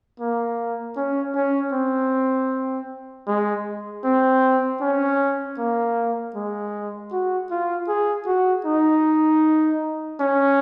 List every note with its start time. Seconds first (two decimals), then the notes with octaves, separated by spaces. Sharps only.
0.20 A#3
0.97 C#4
1.35 C#4
1.73 C4
3.27 G#3
4.04 C4
4.81 C#4
5.58 A#3
6.35 G#3
7.12 F#4
7.51 F4
7.88 G#4
8.27 F#4
8.66 D#4
10.20 C#4